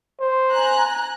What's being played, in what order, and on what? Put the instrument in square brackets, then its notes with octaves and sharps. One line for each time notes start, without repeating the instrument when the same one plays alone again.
[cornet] C5
[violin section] G#5 A#5 F#6